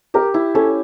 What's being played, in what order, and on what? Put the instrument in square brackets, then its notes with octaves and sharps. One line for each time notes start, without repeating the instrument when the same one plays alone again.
[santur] G4 [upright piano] A#4
[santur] E4
[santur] C#4 [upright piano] A4